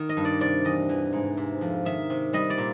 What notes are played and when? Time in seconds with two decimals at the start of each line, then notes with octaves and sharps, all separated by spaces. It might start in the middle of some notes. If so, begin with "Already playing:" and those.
Already playing: D#3
0.09 D#5
0.17 G2
0.25 D5
0.40 C3 D5
0.65 E2 D#5
0.89 E3
1.13 G#2
1.37 C3
1.61 F2
1.85 D#3 E5
2.10 C3
2.33 G3 D#5
2.50 D5
2.58 A#2